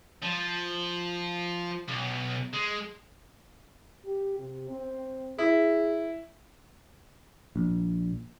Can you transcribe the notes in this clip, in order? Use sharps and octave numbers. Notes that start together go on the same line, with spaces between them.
F3
B1
G#3
G4
C3
C4
E4 G#4
A#1